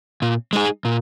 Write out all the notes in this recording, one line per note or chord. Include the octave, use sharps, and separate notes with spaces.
A#2
G#3 D#4 G#4
A#2